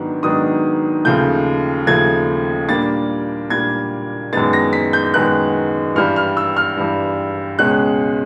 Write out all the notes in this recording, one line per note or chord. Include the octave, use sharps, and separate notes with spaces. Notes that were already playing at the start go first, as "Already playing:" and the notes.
Already playing: G#2 D#3 F#3 B3 D4
G#2 D#3 F#3 B3 D4 D#6
D#2 C#3 F3 A3 G6
D#2 C#3 F3 A3 G#6
A#2 G3 A#3 D4 A6
A#2 G3 A#3 D4 G#6
F#2 D#3 G#3 B3 A6
A#6
B6
G6
F#2 D#3 G#3 B3 F#6
G2 E3 G3 F6
F6
E6
F6
G2 E3 G3
C#2 B2 G#3 C#4 F#6